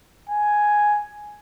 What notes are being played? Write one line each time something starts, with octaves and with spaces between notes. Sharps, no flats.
G#5